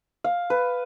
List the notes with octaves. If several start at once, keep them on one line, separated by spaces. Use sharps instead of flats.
F5
B4